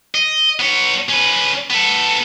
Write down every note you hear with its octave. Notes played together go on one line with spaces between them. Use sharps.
D#5
B3 C#5
C#4 B4
B3 A4